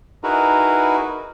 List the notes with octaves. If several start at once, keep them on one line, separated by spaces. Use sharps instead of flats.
D#4 E4 F#4 G#4 A#4 B4